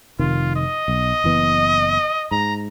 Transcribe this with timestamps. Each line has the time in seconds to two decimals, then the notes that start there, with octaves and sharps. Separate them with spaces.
0.19 F1 C3 D#3 F4
0.56 D#5
0.88 B1
1.24 F#1 E3 B3
2.31 G#2 A#5